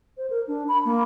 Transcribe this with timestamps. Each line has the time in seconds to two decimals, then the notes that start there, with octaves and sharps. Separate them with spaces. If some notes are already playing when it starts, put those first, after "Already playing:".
0.17 C5
0.30 A#4
0.48 D4
0.68 B5
0.85 A#3